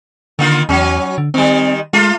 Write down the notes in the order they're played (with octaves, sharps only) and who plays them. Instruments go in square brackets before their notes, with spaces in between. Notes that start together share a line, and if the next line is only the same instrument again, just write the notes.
[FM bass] D3 [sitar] D#3 A#3 F4
[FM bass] E2 [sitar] F#3 C#4
[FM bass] D3
[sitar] D#3 G3 [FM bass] C4
[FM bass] G#3 [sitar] A3 F4